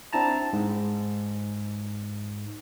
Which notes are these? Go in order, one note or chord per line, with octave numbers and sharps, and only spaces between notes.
C4 D4 E4 A5 A#5
G#2